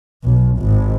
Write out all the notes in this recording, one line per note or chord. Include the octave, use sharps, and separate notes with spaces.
B1
G#1